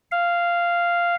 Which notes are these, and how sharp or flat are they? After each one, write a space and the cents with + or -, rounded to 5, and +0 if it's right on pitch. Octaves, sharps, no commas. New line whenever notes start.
F5 -10